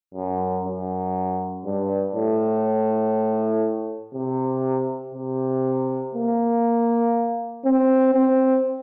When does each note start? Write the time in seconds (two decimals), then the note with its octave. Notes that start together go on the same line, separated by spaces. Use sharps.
0.14 F#2
0.65 F#2
1.65 G2
2.15 A2
4.15 C3
5.15 C3
6.15 A#3
7.65 C4
8.14 C4